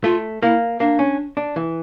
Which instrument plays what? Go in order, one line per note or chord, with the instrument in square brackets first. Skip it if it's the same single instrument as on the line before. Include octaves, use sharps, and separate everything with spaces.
[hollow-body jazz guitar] A3 [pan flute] F4
[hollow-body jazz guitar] A#3 [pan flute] E4
[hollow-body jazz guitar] A#3 [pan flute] D4
[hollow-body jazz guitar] C#4
D4
E3